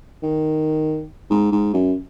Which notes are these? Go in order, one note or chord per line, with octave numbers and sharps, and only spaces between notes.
D#3
G#2
G#2
F#2